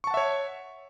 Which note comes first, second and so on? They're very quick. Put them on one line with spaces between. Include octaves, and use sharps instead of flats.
C#6 A5 F#5 E5 C#5